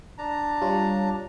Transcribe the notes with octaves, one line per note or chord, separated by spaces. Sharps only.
D4 A5 A#5
G3 F4 C#5